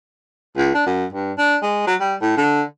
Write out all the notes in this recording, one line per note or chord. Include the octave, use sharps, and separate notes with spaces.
C#2
D4
F#2
G2
D4
G#3
F#3
G3
A2
D3